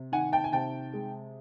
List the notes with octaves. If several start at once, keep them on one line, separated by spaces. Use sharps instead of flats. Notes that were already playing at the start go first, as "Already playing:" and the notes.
Already playing: C3
D#3 F#5 G#5
G5 A5
G#5
C3 G5 A5
G#3